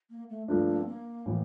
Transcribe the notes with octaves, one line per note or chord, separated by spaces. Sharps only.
A#3
A3
G2 F3 A3 A#3 D4
A#3
C4
A#3
A2 E3